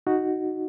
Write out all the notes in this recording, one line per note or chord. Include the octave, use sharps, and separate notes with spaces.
D#4 F#4